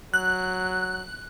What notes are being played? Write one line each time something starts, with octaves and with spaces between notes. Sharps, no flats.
F#3 F#6